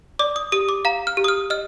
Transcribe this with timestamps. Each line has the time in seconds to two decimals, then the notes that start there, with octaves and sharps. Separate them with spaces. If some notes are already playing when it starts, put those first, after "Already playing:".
0.19 D5 D6
0.36 D#6
0.52 G4 D#6
0.69 D6
0.85 F5 A#5
1.07 F6
1.17 G4
1.24 D#6
1.28 F6
1.50 D#5 F6